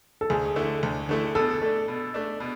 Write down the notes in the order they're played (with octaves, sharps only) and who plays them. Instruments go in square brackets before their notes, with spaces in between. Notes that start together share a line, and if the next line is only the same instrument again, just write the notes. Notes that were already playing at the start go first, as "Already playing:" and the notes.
[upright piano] A4
[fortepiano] D2 [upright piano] G#4
[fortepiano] D3 A3 E4
D2
D3 A3 E4
[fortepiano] B2 [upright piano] A4
[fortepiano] A3 D4
B2
A3 D4
B2